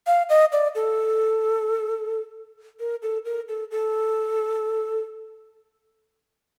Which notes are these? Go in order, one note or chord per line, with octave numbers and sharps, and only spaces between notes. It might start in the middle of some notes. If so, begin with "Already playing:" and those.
F5
D#5
D5
A4
A#4
A4
A#4
A4
A4